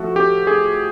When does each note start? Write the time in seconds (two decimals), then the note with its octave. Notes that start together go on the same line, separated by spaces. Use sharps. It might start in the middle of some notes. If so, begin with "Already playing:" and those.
Already playing: F3 A3 F#4
0.16 G4
0.47 G#4